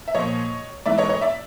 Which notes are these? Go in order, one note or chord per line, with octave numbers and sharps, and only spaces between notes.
E5
A#2 F3 C#5 D#5
G#2 E3 D5 E5
C#5 D#5
C#5 D#5
D5 E5